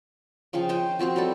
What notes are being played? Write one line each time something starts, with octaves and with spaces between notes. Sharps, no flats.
C#3 F3 F5 G5
C5 D#5 G5
F3 C4 F#4 C5
F#3 G3 E4 A4